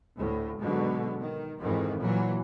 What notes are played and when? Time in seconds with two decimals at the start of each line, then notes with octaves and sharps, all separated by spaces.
0.17 D2 A2
0.59 G#2 B2 D3 F#3
1.22 D#3
1.60 F2 G#2 D#3 E3
2.01 A#2 E3 F#3